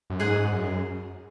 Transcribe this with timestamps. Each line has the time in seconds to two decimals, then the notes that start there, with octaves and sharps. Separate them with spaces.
0.10 F#2
0.20 G#2 G#4 D#5 F#5
0.52 F#2